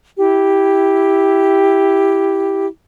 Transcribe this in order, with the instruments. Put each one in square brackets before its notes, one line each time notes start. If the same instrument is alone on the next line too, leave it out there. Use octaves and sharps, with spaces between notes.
[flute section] E4 G4